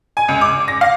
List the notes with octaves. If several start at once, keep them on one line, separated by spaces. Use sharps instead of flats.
G#5
C#2
D6
A#6
F5